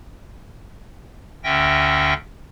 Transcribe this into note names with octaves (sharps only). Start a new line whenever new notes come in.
D2 D3 C#4 E5 G5 A#6